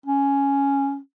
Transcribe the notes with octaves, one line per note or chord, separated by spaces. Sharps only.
C#4